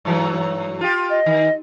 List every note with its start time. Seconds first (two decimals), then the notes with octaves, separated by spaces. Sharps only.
0.05 G2 E3 F#3
0.81 F4 G4
1.10 D#5
1.26 D#3